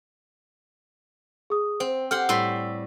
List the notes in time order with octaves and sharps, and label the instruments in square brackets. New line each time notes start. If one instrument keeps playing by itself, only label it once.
[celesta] G#4 D#6
[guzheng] C4 [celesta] C5
[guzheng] G4 F#5 C6 [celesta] A4 F6 G6
[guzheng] A2 G3 C6 [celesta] E6 B6